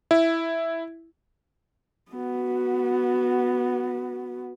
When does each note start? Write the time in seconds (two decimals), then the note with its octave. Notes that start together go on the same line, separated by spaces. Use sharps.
0.11 E4
2.12 B3 F#4